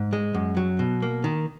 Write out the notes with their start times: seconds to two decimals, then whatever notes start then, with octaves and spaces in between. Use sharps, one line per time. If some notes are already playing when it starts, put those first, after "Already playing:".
Already playing: G#2
0.13 G#3
0.34 F#2
0.57 F#3
0.79 B2
1.02 A#3
1.24 D#3